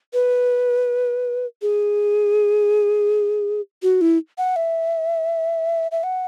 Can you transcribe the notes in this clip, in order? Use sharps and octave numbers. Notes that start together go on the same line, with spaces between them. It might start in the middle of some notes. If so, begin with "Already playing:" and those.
B4
G#4
F#4
E4
F#5
E5
E5
F#5